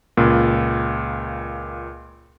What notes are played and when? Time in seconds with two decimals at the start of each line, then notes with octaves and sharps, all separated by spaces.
0.17 C#2 A#2